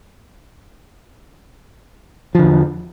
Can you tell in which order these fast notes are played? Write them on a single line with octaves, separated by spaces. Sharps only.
F3 D3 E2